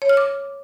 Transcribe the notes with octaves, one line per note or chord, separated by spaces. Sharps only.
C#5
F6
D6